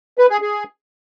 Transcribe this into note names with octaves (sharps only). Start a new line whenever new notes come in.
B4
G#4
G#4